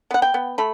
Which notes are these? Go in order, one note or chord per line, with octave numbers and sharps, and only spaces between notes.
B3 F#5
G5
B3
A3 B5